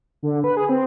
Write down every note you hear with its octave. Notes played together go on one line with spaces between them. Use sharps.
D3
B4
G#4
C4